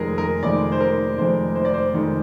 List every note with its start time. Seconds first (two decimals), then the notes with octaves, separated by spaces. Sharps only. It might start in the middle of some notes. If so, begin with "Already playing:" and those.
Already playing: F1 F2 D#3 G#3 G#4 A#4
0.18 A#4
0.43 F1 F2 D#3 G#3 D5
0.72 C5
0.81 A#4
1.17 F1 F2 D#3 G#3 C5
1.55 C5
1.65 D5
1.74 C5
1.93 F1 F2 D#3 G#3